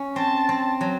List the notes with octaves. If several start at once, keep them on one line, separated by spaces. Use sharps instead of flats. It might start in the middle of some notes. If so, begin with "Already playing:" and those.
Already playing: C#4
C4 A5
C4
F#3